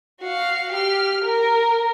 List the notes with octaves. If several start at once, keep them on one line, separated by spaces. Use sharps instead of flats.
F#4 F5
G4 F6
A#4